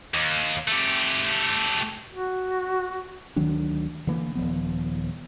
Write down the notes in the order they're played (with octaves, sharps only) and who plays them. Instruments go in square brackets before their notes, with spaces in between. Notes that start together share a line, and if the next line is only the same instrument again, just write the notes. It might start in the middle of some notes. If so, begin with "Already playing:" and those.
[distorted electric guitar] D#2
A3 G4
[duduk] F#4
[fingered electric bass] D2 D#3 F#3 D4
D3 E3 A#3
D#1 F3 B3